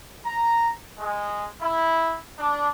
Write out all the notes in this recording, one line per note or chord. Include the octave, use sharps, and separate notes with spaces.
A#5
G#3
E4
D4